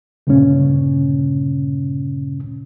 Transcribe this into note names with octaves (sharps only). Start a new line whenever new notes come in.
D2 G2 A#2 C#3 C#4